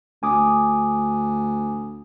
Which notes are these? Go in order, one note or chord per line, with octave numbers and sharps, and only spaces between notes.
D2 G#5 D6 D#6